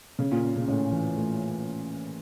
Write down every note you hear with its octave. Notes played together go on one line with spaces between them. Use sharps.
C#3 C#4
A#2
C#4
C#3
A2 C#4
E3
A3